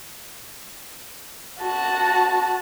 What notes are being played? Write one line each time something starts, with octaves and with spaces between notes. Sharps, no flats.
F#4 A5